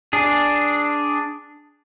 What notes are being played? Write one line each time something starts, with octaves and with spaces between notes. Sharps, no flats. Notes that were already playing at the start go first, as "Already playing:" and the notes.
D4 G#4